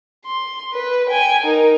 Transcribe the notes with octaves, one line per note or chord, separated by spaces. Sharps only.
C6
B4
G5 G#5
D#4 A#4